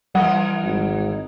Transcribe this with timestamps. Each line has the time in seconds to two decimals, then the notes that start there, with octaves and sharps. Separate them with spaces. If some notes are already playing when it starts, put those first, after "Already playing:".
0.15 E3 G3 A#4 D#5 F#5
0.64 G#1